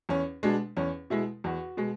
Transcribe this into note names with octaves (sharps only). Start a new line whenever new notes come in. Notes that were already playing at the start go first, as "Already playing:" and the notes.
E2 C#4
B2 G#3 D4
E2 C#4
B2 G#3 E4
E2 F#4
B2 G#3